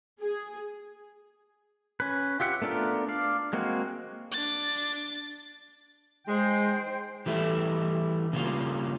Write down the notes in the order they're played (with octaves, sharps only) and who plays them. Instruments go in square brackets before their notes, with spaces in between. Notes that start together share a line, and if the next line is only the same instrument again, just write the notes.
[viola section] G#4
[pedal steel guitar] C#4 B4
F4 G4 E5 F#5
A3 B3 D4 F4 A#4
D4 D5 F5
G#3 A#3 C4 F#4
[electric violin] D4 A6
[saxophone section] G#3 [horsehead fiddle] C5 G5
[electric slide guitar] E3 G3 A3 E4
C#3 G3 A#3 C#4 F4